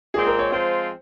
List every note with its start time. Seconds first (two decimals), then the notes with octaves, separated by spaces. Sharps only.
0.14 A#2 G#3 C4 G#4
0.27 A#4
0.39 C#5
0.51 F3 G#3 C4 F4 C5